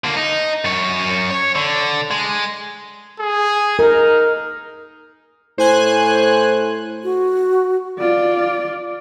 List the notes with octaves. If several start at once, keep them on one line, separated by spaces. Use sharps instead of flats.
D3 A#3
D#4
F#2 C#5
C#5
D3
G#3
G#4
D#4 A#4
A2 C5 G#5 F#6
F#4
F4 D5